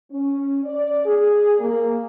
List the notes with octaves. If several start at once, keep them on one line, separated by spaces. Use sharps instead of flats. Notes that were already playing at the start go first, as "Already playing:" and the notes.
C#4
D5
G#4
A#3